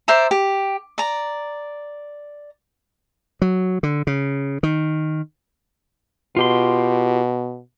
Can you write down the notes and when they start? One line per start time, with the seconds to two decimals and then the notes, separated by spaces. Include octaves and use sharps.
0.08 C5 D5 E5 A#5
0.31 G4
0.98 D5 A#5
3.42 F#3
3.83 D3
4.07 C#3
4.63 D#3
6.36 B2 F4 G4 C6